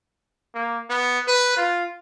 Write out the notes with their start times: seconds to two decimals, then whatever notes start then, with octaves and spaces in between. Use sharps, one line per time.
0.54 A#3
0.90 B3
1.28 B4
1.57 F4